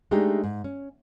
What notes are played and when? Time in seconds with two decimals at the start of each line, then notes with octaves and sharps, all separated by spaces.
0.11 G#3 A3 D4 D#4 G4 G#4
0.44 G#2
0.64 C#4